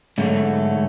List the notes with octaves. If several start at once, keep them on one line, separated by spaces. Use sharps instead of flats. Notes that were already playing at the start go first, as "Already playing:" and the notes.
G#2 D3 F#3 A3